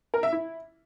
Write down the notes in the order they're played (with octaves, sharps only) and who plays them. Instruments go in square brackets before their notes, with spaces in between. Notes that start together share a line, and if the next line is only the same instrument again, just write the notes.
[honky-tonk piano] A#4
E5
E4